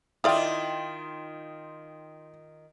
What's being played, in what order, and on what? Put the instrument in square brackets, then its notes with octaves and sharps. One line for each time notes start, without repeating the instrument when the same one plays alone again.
[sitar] D#3 F4 [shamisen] E4 D5 F5 [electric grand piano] G5 C6 D#6